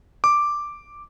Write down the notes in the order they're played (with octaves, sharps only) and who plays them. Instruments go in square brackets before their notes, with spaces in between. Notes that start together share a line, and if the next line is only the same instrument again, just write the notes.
[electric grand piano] D6